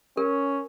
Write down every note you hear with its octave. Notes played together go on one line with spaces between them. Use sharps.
C#4 A#4